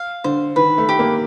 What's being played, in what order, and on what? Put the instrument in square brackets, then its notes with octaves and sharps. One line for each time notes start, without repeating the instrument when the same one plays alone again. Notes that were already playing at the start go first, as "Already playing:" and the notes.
Already playing: [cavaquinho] F5
[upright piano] D3 [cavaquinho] C5
[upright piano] D#3 [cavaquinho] B4
[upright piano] A3
[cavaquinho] G4
[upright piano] A#3